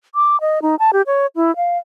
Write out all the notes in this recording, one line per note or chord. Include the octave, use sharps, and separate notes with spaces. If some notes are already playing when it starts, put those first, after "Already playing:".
D6
D#5
D#4
A5
G4
C#5
E4
F5